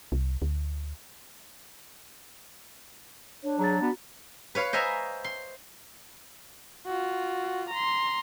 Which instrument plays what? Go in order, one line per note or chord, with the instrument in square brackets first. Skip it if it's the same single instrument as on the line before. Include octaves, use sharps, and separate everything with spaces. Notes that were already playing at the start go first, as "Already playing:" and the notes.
[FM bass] C2
D2
[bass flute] D4 [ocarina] C#5
[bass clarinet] F#3 [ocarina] G#4 [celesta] A#5 A6
[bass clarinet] B3 [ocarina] F#4
[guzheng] B4 C#5 F5
C5 D#5 E5 G#5 A#5
C6
[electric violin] F4 F#4
A#5 C6